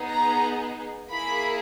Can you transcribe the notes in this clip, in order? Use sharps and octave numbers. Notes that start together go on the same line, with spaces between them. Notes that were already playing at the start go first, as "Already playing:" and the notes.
Already playing: B3 D#4 G#4
A#5
A#3 E4 G#4 B5